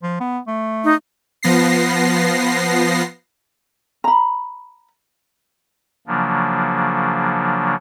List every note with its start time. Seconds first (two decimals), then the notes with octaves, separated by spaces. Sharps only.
0.03 F3
0.20 B3
0.47 A3
0.84 D#4
1.43 F3 B3 A#6 C7
4.04 A#5 B5
6.07 C#3 F3 F#3 A#3 D4